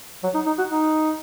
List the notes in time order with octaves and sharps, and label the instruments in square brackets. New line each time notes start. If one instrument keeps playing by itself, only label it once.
[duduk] F#3
D#4
D#4
F#4
D#4